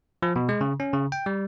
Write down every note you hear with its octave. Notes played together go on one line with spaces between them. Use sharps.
F3
B2
G#3
C#3
C#4
C#3
G5
G3